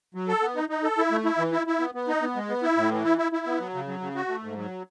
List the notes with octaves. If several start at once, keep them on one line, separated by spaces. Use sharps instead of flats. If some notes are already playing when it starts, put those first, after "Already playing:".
F#3
A4
B3
D#4
D#4
A4
E4
A3
E4
E3
E4
E4
B3
B3
D#4
B3
G#3
B3
E4
A2
E3
E4
E4
E4
B3
F#3
C#3
F#3
C#3
F#4
A3
G#2
F#3